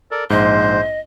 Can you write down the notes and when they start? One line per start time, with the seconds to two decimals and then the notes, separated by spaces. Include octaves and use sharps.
0.11 A4 A#4 D5
0.30 A#1 G#2 C5 D#5